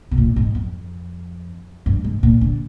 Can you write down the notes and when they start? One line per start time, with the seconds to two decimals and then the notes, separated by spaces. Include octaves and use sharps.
0.11 C3
0.18 A#2
0.36 G#2
0.55 F2
1.86 G2
2.04 G#2
2.23 A#2
2.41 D3